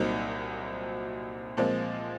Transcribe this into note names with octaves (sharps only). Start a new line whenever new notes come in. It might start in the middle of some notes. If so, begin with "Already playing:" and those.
Already playing: C2 A#2 F#3 C4 D#4
A#2 F3 G#3 C4